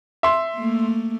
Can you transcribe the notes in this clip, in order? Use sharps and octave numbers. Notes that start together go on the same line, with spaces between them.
E5 C6
A3 A#3